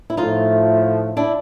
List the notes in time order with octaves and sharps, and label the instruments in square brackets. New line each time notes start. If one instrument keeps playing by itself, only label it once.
[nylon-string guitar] E4
[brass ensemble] A2 F3 A3 [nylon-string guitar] D#4 F4
[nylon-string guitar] D4 E4